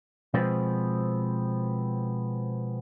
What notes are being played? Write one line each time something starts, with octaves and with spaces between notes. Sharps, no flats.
B2 F3 G#3 B3 C4